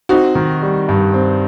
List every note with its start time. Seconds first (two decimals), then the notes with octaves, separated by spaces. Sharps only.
0.09 C4 D#4 F#4
0.35 D#3
0.63 G3
0.89 G2
1.14 C4